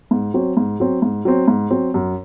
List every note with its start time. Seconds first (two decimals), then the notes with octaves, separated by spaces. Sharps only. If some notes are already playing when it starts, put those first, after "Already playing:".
0.11 G#2
0.34 F#3 C4
0.57 G#2
0.80 F#3 C4
1.02 G#2
1.25 F#3 C4
1.48 G#2
1.70 F#3 C4
1.94 F#2